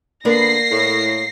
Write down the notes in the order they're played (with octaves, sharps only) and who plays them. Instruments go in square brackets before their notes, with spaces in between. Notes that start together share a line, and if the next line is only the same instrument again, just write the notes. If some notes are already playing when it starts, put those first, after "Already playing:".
[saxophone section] D3 B3 B4 [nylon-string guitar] A#3 A#4 D5 [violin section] A#6 C7
[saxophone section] A2